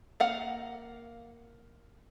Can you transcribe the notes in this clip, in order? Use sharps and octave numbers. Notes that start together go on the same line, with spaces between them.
A#3 F5 F#5